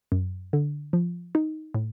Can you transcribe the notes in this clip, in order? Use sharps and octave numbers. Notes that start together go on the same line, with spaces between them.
F#2
D3
F3
D#4
A2